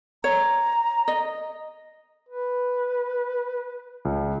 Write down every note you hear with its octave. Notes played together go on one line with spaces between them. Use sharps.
C#5 A#5
D#5
B4
C#2